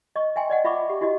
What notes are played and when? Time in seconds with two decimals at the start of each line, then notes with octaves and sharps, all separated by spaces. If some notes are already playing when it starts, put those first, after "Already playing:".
0.16 D#5 C#6
0.36 E5 G5 G#5 C6
0.50 D5 D#5 F#5
0.64 F4 E5 B5 C#6 D6
0.90 G4
1.01 E4 F#4 G4 D#5